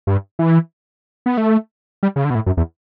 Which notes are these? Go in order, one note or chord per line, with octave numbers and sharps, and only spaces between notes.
G2
E3
B3
A3
G3
C#3
D3
B2
A2
F#2
E2